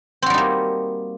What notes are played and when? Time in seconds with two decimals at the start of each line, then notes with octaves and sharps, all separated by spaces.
0.22 C4
0.26 F#4
0.30 G3
0.34 D#4
0.38 A#3